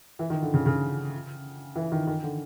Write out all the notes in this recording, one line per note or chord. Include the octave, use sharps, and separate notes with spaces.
E3
D#3
D3
C#3
C#3
E3
D#3
D#3
D3